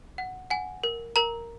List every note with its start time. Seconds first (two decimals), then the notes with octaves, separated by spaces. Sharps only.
0.18 F#5
0.50 F#5 G#5
0.84 A#4
1.16 A#4 A#5